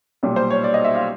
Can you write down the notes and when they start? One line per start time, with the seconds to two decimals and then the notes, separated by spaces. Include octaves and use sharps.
0.23 B1 A#2 G3
0.36 C5
0.50 C#5
0.64 D5
0.74 D#5
0.84 E5
0.95 F5